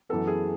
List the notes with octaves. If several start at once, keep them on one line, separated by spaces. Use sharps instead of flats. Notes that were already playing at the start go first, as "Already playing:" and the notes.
F#2 E3 B3 A4
G#4